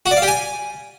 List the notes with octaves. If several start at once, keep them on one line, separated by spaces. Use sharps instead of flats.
F#4
D5
F5
G4
G#5